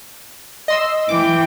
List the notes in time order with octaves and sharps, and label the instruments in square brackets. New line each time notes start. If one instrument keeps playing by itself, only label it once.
[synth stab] D#5 C6 E6
[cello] E3 G5 [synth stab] D6